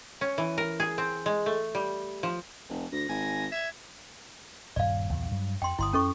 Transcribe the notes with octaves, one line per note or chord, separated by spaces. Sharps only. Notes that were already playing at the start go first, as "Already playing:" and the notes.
C#4
E3
A#4
G#4
C4
G#3
A3
G3
F3
F1
D2 A#6
G#1 G#5
E5 G#6
D#1 G2 D5 F5
B1 E2 A#2
G2 F#3
F2 G5 C6
G1 E4 C6 D#6
F#2 C#4 A4 C#6